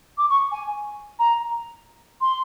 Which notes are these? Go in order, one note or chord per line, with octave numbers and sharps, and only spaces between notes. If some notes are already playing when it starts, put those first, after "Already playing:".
D6
C#6
G#5
A#5
C6